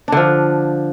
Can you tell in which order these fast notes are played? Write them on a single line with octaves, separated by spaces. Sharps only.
D4 D3 F3